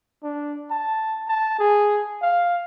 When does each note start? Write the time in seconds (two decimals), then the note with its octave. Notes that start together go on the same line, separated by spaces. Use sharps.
0.23 D4
0.71 A5
1.28 A5
1.59 G#4
2.22 F5